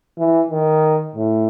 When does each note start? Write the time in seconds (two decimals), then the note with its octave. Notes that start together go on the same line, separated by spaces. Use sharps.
0.18 E3
0.50 D#3
1.15 A2